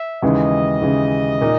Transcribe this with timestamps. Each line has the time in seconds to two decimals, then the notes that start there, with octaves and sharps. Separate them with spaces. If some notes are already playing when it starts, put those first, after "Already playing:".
Already playing: E5
0.22 D#2 C#3 E3 G#3 D#5
0.82 D#2 C#3 E3 G#3
1.41 A#2 A#3 D#4